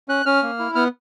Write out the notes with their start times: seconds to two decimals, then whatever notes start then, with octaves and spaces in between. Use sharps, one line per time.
0.08 C#4 F#6
0.26 C#4 F6
0.43 A#3
0.59 E4
0.75 B3 F6